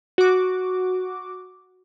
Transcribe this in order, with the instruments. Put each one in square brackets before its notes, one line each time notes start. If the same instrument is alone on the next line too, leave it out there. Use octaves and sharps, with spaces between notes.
[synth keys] F#4 D6